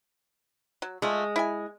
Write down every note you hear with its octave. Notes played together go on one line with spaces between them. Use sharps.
F#3
G#3 A3 F4
E4 E5 G#5